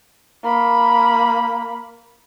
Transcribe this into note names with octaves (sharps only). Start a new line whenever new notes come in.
A#3 B5